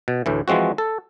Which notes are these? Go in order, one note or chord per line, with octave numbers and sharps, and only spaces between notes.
B2
D2 A2 E3
E3 F3 G#3 C4 F#4
A4